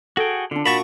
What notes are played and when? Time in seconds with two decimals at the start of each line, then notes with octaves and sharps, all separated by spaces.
0.17 F#4 G#4 A4 G5
0.51 D3 D4 F4
0.66 A#2 F#4 A5 B5 C#6